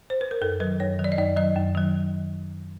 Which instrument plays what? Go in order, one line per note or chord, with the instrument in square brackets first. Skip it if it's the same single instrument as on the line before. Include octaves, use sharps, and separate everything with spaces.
[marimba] C5
B4
A#4
F#2 A4
F#3 B4
D#3
F#2 C#5
D#3 F#3
D5
D#5
F#2 D5
D#3 F#3 D#5
F#2
D#3 F#3